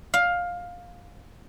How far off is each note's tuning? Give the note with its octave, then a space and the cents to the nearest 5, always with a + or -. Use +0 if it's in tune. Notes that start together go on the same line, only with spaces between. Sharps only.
F5 +15